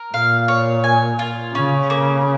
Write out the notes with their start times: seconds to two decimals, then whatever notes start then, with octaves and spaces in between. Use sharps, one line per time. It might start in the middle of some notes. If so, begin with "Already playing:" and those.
Already playing: A#4
0.14 A#2 F5
0.48 C#5
0.84 G#5
1.19 F4
1.54 C#3 C#4
1.90 A#3